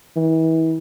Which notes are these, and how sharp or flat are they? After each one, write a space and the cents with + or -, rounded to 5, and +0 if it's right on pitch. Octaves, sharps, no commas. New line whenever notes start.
E3 -35